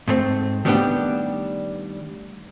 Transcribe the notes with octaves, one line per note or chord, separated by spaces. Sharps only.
G#2 A3 C4
D#3 G3 A3 B3 D4 G4